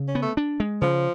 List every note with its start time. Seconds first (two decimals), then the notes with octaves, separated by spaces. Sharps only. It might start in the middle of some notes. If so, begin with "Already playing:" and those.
Already playing: C#3
0.08 C#4
0.15 B3
0.22 A3
0.37 D4
0.60 G#3
0.82 C#3 F3